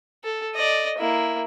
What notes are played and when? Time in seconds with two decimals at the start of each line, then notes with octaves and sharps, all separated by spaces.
0.24 A4
0.55 D5 D#5
0.98 A#3 E4